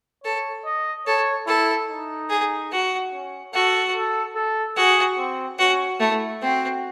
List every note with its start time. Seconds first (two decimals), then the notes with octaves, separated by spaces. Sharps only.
0.24 A4 C#5
0.65 D#5
1.07 A4 C#5
1.47 E4 A4
1.89 D#4
2.30 G#4
2.71 F#4
3.12 C#4
3.54 F#4 A4
3.95 A4
4.35 A4
4.76 F#4 G#4
5.18 C4
5.59 C#4 F#4
6.00 A3 E4
6.42 C4 F#4